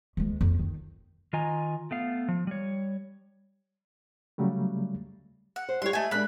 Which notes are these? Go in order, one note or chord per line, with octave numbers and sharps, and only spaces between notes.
D2 G#3
F2
D#3
D#3 F4 D#5 G#5 A#5
A3 B3 F5
F3
G3 C#5
C#3 F#3 G3 A3
F#5
C5
G3 E4 G4 C#5 C6
A3 D#5 G#5
G#3 A#3 D4 B5 F#6